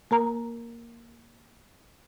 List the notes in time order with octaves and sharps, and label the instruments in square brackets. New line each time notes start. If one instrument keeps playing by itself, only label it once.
[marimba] A#3 A#4 A#5